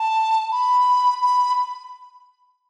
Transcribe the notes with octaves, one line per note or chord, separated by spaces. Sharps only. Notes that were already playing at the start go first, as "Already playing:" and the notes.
Already playing: A5
B5
B5